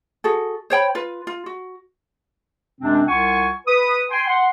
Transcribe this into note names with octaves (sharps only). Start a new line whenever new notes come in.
F#4 G#4 A4
C5 C#5 G5 B5
F4 B4
F4
F#4
F#2 C3 G#3 C4 D4
C2 F4 F#5 G#5 C#6
B4 D#6
G5 G#5 C6
F#5 C6